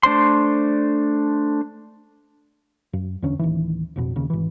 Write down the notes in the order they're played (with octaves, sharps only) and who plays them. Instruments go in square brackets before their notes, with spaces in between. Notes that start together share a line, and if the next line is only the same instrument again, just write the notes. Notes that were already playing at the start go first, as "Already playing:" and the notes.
[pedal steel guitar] A3 D4 C5 C6
[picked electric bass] F#2
E2 D3 C#4
D1 D#3 E3
A1 F2 B2
D#2 C#3
G#1 E3